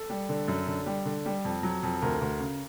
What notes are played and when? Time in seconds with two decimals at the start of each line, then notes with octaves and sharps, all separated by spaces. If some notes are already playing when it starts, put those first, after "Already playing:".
Already playing: A4
0.10 G3
0.29 D3
0.48 F#2
0.67 D3
0.86 G3
1.05 D3
1.26 G3
1.45 F2
1.63 F#3
1.83 F2
2.02 D2 A#4
2.21 D2
2.40 C#3